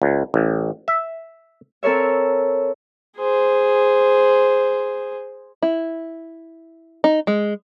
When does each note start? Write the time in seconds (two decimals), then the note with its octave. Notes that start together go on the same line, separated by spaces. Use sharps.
0.02 C#2
0.34 A1
0.88 E5
1.83 C4 A4 A#4 C#5 E5
3.18 G#4 C5
5.62 E4
7.04 D#4
7.27 G#3